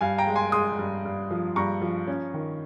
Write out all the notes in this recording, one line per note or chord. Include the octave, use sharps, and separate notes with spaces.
G2 F5 G#5
G5 A#5
G#3
G#5 C6
G#3 C6 D#6
G2
G2
F3
G2 A#5 C#6
F3
C#4
D#3